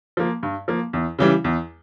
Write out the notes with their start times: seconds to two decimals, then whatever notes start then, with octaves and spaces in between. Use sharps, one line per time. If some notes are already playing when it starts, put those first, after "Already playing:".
0.17 F3 A#3
0.43 G2
0.68 F3 A#3
0.93 E2
1.19 C#3 E3 G3
1.44 E2